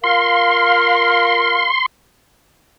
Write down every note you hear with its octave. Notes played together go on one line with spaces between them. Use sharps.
F4 A#4 F5 C6